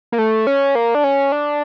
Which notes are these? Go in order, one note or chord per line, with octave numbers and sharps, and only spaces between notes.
A#3
A3
C#4
A#3
D4
C#4
D4